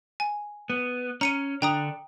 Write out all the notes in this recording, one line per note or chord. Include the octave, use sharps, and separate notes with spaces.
G#5
B3
C#4 A#5 C#7 D#7
D3 D4 G5 A#5 D#6